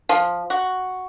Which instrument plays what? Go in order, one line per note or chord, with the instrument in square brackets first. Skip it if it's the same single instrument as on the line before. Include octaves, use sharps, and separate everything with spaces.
[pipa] F3
F#4